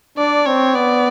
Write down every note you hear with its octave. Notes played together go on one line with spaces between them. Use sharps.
D4 D5
C4 C#5
B3 D5